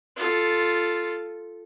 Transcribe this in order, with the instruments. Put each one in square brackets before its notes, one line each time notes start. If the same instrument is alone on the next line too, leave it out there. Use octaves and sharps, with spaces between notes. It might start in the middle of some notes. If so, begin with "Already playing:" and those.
[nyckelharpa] F4 A4